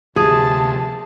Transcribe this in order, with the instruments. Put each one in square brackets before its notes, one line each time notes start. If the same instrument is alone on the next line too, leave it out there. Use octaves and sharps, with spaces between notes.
[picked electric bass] D2 F3 [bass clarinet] C3 [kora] G#4 [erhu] A5